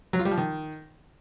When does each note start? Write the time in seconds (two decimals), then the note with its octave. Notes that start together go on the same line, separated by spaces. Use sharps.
0.13 F#3
0.19 F4
0.25 G3
0.31 F3
0.38 D#3